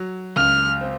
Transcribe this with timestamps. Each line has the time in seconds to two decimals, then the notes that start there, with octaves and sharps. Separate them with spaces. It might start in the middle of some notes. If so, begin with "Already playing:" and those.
Already playing: F#3
0.36 C#2 F6
0.81 C4